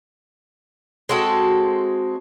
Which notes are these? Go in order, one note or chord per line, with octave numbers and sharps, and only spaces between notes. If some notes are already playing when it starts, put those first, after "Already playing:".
G#3 C4 F#4 A4